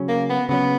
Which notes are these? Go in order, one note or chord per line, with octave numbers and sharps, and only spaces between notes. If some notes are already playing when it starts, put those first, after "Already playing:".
Already playing: C#3 F#3 C#4
A#3
B3
C#3 F#3 B3 C#4